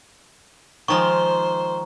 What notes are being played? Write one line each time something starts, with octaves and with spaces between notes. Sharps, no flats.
D#3 F3 G#3 C5 A#5 C#6